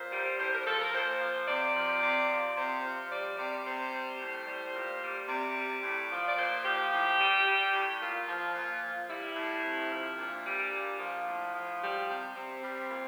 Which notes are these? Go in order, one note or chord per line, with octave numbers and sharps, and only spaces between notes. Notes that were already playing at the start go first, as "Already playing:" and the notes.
Already playing: A#2 C5
G3
A2 C5
A#4
F3 A4
A#4
A#2 C5
F3
C3 D5
F3
C3
F3
C3 C5
F3
G3 D5
C3 D5
C3 C5
G3
A2
G3
A#2
G3
C3 D5
G3
A2
F3
D5
A#2 C5
F3 G4
A2
G3
G3
A2
A#2 F4
F3
A#2
F3
G3 E4
A2
C3
F3
A#2 D4
G3
A#2
F3
A2
F3
G3
C3
C3 C4
G3
A#2